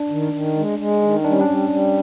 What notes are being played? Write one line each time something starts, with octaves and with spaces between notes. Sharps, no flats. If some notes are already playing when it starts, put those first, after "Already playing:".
Already playing: D4
D#3
D#3
G#3
G#3
D#3
G3 D4
C#4
D4
G3
G3